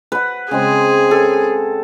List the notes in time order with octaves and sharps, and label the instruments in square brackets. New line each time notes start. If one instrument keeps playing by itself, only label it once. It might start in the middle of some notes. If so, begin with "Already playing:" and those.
[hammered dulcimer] B4 F#5
[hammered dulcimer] C#3 G#3 C4 [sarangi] G#4
[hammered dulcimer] A4